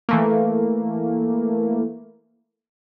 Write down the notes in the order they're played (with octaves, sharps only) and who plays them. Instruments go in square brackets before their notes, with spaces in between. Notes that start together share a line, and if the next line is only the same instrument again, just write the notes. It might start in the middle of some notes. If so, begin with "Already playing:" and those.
[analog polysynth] E3 A3 A#3